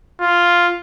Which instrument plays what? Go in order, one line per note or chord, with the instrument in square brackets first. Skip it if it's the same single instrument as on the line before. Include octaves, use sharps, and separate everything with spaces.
[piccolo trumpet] F4